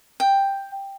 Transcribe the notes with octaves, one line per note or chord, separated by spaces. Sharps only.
G5